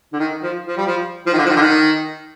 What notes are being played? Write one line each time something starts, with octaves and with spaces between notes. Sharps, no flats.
D3
D#3
F3
F3
G3
F3
F3
D#3
D3
F3
D#3
D3
D#3